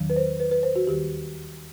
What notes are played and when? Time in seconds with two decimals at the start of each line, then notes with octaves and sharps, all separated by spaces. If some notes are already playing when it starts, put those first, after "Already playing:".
Already playing: E2 D#3 F#3
0.10 B4
0.16 C5
0.40 B4
0.51 B4
0.63 C5
0.76 F#4
0.87 D#2 D#3 G3 G4